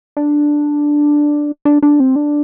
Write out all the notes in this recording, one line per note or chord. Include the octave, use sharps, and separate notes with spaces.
D4
D4
D4
C4
D4